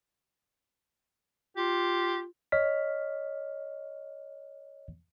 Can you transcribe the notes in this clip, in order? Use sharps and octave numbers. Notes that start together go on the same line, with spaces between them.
F4 G4
C#5 D#5 F6 B6